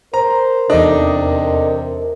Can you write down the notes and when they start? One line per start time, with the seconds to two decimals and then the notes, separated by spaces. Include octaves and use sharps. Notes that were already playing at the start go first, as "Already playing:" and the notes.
0.14 A#4 C5 A#5
0.70 E2 C3 D4 D#4 A4 D#5